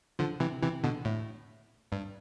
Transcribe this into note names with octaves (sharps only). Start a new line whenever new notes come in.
D3 F3
C3 E3
C3 E3
B2 D3
A2
G2